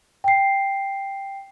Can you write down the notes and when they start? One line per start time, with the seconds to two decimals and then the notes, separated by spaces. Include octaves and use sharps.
0.24 G5 C7